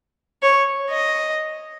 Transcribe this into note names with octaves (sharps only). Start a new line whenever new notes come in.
C#5
D#5